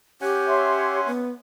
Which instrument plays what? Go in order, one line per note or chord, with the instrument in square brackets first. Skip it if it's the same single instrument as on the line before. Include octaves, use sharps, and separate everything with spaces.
[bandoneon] C#4 F#5 G#5 [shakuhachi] G4
[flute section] C#5 E5 C6
[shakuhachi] B3